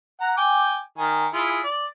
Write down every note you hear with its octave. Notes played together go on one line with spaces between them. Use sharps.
F#5 A#5
G5 G#5 D6
D#3 G#5
E4 F4 G#4
D5